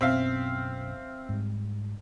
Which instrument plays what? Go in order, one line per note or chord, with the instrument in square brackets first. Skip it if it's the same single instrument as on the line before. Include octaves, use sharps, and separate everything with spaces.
[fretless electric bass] B1 F#2 B2 [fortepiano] C4 E5 F5
[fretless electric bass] G#2 G3